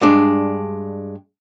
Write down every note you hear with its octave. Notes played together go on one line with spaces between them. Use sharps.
G2 G#3 D4